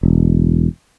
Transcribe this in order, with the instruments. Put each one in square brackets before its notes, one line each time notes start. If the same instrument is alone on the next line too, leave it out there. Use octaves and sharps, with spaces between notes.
[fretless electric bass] E1